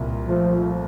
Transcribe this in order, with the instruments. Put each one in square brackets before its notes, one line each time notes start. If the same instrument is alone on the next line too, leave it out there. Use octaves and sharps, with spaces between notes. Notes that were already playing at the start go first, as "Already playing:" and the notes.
Already playing: [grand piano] C2 A#2
[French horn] F3 [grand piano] A3